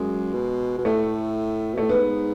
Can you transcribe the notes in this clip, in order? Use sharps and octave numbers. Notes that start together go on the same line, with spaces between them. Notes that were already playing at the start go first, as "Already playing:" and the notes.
Already playing: F#2 G#3
B2
B2
A2 A3
B2
A2 A3
G#2 B3